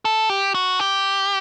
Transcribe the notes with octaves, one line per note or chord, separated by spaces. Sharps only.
A4
G4
F#4
G4